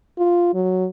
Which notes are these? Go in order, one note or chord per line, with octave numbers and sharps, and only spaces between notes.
F4
F#3